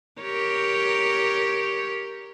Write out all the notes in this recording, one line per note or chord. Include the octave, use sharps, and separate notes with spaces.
G4 A#4 C#5